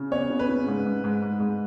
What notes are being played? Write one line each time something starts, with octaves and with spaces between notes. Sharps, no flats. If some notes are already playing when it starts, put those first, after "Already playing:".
Already playing: C#3
B3 C#5
C#3
B4
C#3
G#2
G#2
G#2
G#2
G#2